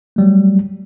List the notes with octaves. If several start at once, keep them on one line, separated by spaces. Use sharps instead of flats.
F#3 G3 A3